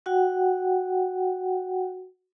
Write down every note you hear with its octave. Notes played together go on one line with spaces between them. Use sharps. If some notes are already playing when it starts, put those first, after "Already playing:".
F#4 F#5 G5